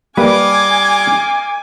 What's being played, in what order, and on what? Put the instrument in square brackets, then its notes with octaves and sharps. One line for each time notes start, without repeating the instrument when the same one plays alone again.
[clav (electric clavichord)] G3 [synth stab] A#3 B4 [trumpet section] D#5 F5 D6 [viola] G#5